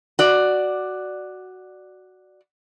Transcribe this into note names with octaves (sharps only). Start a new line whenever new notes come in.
F#4 D5